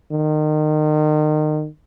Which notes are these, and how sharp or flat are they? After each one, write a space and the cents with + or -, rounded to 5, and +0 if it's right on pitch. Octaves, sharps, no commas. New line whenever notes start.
D#3 -30